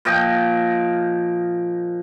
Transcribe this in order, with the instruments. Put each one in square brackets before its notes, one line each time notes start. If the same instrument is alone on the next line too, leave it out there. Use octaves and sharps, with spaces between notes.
[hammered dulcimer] A#2 F3 D#5 G5